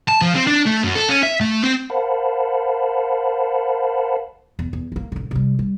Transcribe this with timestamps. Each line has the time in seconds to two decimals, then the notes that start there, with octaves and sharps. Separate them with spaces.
0.08 A5
0.21 F3
0.35 C4
0.47 D4
0.66 A3
0.84 F#2
0.95 A4
1.09 C#4
1.23 E5
1.41 A3
1.63 C4
1.90 A#4 C5 F5 F#5 A5 B5
4.59 E2
4.73 E2
4.92 G#3 A#3
5.12 A1 D3
5.31 C3 G3
5.59 G3